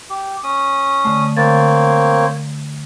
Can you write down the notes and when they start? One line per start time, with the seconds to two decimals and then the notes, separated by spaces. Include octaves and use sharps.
0.10 G4
0.43 C#4 D#6
1.05 D3 A3
1.37 D3 A#3 C4 C#5 A6